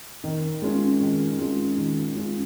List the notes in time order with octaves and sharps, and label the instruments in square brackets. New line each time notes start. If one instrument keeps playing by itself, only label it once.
[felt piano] D#3
G#3 C#4 F4
D#3
G#3 C#4 F4
D#3
G#3 C#4 F4